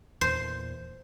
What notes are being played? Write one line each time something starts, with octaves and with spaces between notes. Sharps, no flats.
E2 A#2 C5